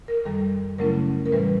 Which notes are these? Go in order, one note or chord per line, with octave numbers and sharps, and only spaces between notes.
A#4
F#2 D#3 G3 A4
C#3 F#3 A3 C#4 E4 A#4
A#4
A2 E3 G3 B4